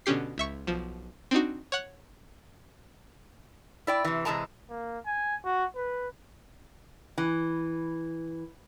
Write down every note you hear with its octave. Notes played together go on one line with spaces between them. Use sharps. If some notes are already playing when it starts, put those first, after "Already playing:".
B2 D3 C#4 G4 C7
C#2 E5 C#6
B1 F3
C4 D4 D#4 F#4
C#5 F#5 F#6
E4 D5 G5
C3 E3
C3 E3 G#3 A5 A#5
A#3
G#5
F#4
B4
E3